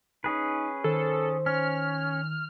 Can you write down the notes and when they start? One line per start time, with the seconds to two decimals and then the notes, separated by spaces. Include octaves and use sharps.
0.24 C#4 D#4 G#4 B4
0.84 D#3 A4 C5
1.46 C#4 F6